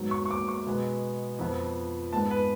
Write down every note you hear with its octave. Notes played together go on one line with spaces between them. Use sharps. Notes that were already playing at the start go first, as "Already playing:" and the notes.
Already playing: G#2 F#3 B3
C#6
C#6
D6
C#6
B2 G#3 B3
F2 F3 B3
G#2 G#3 B3 A5
B4